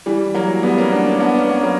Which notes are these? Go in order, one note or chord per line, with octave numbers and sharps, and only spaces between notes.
E3 G3
F#3 A#3
G3 B3
A#3 C#4
B3 D4
A#3 C#4
B3 D4
A#3 C#4
B3
A#3 C#4
F#3 A#3